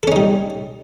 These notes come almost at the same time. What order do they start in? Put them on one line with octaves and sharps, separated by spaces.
A4 C#4 D#4 G3